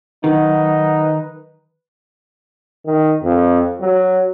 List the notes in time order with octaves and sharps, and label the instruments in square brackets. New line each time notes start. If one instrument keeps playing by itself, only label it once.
[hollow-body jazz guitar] D#3 [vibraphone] F#3 F#5 [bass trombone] D#4 [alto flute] B4
[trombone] D#3
F2
F#3